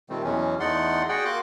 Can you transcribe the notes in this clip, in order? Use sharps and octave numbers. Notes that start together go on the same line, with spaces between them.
A#2 D#3 G3 A3 C4
E2 B2 E3 F#3 C#4
E2 A3 D#4 D5 F#5 C6
F#4 G#4 D5 F#5 G5
A#3 F#4 C6 D6 F#6